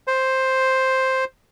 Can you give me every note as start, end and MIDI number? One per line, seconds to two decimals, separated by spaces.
0.07 1.25 72